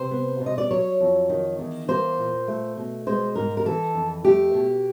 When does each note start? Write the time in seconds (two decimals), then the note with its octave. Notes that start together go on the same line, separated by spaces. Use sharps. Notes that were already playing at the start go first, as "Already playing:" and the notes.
Already playing: C3 C5
0.11 B3
0.41 B2
0.46 D#5
0.58 D5
0.71 F#3 C#5
1.00 F2
1.29 D#3
1.59 E2
1.88 A#3 C5
2.18 A#2
2.48 A3
2.77 B2
3.07 G#3 C5
3.35 G#2 A#4
3.57 A#4
3.65 E3 A4
3.95 F2
4.25 A3 G4
4.54 B2